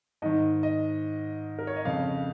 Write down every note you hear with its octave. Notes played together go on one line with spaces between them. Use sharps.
G#2 D#3 D#5
D#5
A#4
C#5
D#5
F2 C#3 F5